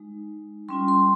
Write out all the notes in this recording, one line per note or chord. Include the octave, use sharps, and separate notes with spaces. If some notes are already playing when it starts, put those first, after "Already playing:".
Already playing: G#3 D#4
G3 C#4 F4 C6
C6